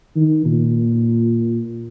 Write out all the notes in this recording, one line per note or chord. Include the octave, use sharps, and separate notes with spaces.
D#3
A#2